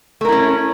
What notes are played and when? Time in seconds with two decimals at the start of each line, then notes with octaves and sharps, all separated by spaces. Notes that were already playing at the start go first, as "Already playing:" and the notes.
0.21 A3
0.25 A#4
0.29 E4
0.32 C#4